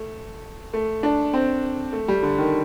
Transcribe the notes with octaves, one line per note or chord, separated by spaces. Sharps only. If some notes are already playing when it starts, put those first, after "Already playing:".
Already playing: A3
A3
D4
C4
A3
G3
D3
D#3